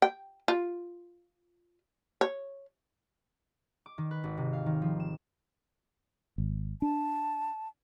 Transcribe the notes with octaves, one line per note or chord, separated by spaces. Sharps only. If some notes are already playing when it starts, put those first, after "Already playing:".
G5
F4
C#5
D6
D#3
B4
G#1
C3
F5
D#3
F3
E7
G#1
D4 A5